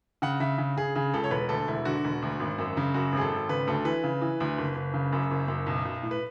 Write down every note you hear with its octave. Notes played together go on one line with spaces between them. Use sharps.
C#3 F#5
C#3 E5
C#3
C#3 G#4
C#3 G#4
C#2 A4
C#5
E1 B4
D2 A4
E1 E4
D3 F#4
E1
D2
G#1
F#2
C#3
F#2 F#4
G#1 G#4
A4
G#1
C#3 B4
D2 A4
E3 B4
C#3
E3
D2
F#1
F#1
C#3
F#2
F#1
F#2
B1
B1
A2
B4